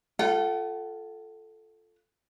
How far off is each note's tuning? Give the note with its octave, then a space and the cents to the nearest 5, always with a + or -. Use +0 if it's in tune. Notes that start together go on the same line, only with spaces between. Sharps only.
F4 +0 A4 +0 F#5 +40